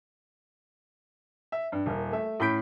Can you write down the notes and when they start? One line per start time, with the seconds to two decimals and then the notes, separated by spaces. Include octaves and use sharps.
1.52 E5
1.72 G2
1.86 D#1 A#4
2.12 A3 E5
2.40 A2 C#4 B5 G6 B6 D7